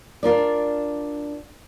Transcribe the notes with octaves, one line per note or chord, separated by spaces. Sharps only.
D4 F4 A#4 D5